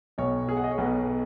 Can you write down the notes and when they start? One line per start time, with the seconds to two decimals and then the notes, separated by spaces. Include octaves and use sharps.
0.18 B1 B2 C#5
0.49 G#4
0.57 F#5
0.64 D#5
0.71 C#5
0.78 B1 B2 B4